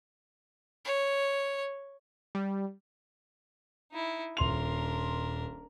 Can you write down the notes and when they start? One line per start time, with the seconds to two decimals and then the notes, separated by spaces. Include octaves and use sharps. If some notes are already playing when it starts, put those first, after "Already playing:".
0.85 C#5
2.35 G3
3.92 D#4 E4
4.37 D#1 D4 A#4 C6 F7